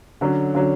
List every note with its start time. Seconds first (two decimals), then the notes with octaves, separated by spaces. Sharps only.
0.21 D3 F#3 C#4
0.54 D3 F#3 C#4